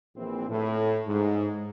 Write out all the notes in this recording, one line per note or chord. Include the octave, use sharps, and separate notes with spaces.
A#1 E3 C4
A2
G#2